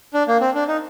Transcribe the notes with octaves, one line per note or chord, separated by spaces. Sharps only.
D4
A#3
C4
D4
D#4